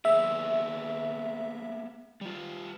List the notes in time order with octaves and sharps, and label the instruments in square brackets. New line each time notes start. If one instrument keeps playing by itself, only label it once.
[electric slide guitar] A#3 B3 G#4 [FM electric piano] E5
[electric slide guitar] G3 F4